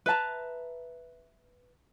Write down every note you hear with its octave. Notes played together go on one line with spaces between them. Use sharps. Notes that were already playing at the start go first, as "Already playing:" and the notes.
B4 E5 A5 A#5